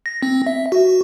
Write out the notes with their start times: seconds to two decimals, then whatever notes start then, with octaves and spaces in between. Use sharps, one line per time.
0.06 A#6
0.23 C4
0.47 E5
0.72 F#4